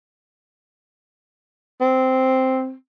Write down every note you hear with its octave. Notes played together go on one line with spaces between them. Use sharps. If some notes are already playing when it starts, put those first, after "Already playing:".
C4